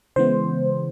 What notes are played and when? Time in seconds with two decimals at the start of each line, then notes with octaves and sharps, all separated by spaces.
0.16 C#3 E3 G#3 B3 C5